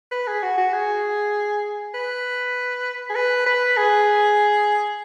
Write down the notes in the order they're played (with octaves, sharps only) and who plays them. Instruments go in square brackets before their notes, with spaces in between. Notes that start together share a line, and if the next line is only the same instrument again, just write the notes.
[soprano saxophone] B4
G#4
F#4
F#4
G#4
B4
G#4
B4
B4
G#4